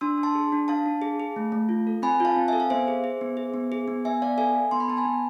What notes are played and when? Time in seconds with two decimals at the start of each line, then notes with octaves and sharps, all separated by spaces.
0.01 D4 C6 E6
0.18 D4
0.23 A5 C6
0.35 G#4
0.52 D4
0.68 D4 F5 A5
0.86 D4
1.02 G#4
1.20 G#4
1.36 A3
1.52 A3
1.69 F4
1.87 A4
2.02 C4 G#5 B5
2.20 F4 F5 A5
2.36 C4
2.48 A4 E5 G#5
2.60 F5
2.70 B3 C5 E5
2.88 G#4
3.04 G#4
3.21 B3
3.37 G#4
3.54 B3
3.72 G#4
3.88 B3
4.05 B3 E5 G#5
4.22 B3 D5 F5
4.38 A4 E5 G#5
4.55 A4
4.71 B3 C6
4.80 B5
4.88 B3 A5
4.97 G#5 B5
5.05 B3